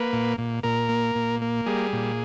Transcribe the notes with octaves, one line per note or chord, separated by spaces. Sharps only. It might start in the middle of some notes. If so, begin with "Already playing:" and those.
Already playing: A#3 B4
A#2
A#2
A#2 A#4
A#3
A#2
A#3
G3 G#4
A#2